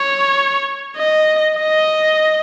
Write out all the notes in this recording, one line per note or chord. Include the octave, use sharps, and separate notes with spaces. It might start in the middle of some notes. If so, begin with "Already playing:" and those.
Already playing: C#5
D#5
D#5